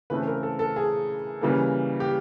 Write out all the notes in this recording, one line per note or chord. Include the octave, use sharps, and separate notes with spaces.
C#3 E3 A3 C4 B4
A#4
A4
A4
G#4
C#3 E3 G3 A#3
G4